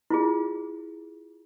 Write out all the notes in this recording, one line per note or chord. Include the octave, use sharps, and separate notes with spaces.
E4 F4 G#4